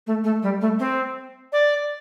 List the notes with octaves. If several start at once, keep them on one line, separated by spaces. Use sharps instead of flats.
A3
A3
G3
A3
C4
D5